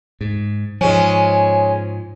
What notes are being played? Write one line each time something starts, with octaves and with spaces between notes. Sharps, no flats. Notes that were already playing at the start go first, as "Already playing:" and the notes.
G#2
G#2 F3 G#3 C#4